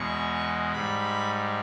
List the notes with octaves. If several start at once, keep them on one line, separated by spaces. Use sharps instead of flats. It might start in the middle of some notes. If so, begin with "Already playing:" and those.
Already playing: E2 B2 G#3 C#6
G#2 G3 B5